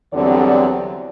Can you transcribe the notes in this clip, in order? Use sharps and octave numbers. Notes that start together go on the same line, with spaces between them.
E2 D3 F#3 G3 C4 D5